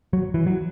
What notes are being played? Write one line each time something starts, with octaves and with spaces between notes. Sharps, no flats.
F#3
E3
F#3